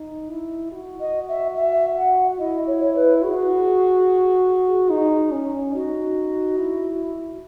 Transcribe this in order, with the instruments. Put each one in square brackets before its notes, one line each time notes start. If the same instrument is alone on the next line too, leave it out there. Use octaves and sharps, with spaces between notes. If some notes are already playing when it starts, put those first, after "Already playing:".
Already playing: [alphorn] D#4
E4
F#4
[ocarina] D#5
E5
E5
F#5
[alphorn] E4 [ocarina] D#5
[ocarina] C#5
C#5
B4
[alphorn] F#4 [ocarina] G#4
[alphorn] D#4
C#4
[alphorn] D#4 [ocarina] F#4
[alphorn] E4